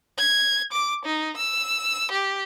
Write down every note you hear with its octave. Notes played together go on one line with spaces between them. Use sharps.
G#6
D6
D#4
E6
G4